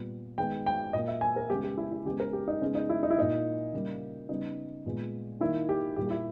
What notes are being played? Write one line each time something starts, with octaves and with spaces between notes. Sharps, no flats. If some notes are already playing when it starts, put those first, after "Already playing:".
Already playing: A#2 G3 B3
D#3 G#3 B3 G5
G5
A#2 A#3 D#5
E5
G#5
A#4
C#3 G#3 B3 G4
G4
E4
E4
C#3 G#3 B3 G4
A#4
G4
D#4
C#3 G#3 B3 C#4
D#4
E4
D#4
E4
A#2 A#3 D#4
C#3 G3 A#3
C#3 G3 B3 D#4
A#2 G#3 B3
D#3 A#3 E4
G4
A#2 G3 A#3 G4
G4
E4